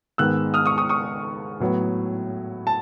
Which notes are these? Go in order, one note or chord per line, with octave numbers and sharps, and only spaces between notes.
G#2 D#3 G#3 B3 E6 F#6
D#6 F6
C#6 D#6
C#6 D#6
C#6 D#6
A2 F#3 B3
A5